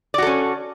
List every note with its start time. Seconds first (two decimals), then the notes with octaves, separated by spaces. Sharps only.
0.14 D5
0.18 F#4
0.22 A4
0.27 C#4